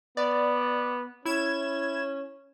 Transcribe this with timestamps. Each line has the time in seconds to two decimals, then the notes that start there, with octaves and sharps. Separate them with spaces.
0.17 B3 D5
1.25 C#4 E4 G#6 E7